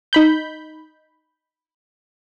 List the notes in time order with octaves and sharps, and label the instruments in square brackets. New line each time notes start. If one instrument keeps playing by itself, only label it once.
[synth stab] D#4 B5 G6